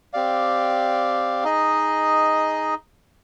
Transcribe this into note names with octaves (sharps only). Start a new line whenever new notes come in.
C4 G4 D5 F5
D#4 G#4 D#5